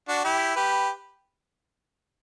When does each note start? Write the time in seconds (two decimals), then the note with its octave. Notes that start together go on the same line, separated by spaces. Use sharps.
0.08 D4 F#4
0.24 E4 G4
0.55 G4 B4